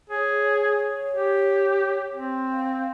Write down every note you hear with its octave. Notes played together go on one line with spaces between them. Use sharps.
G#4 C#5
G4
C4
F5